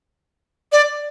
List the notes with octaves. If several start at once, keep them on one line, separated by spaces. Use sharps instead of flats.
D5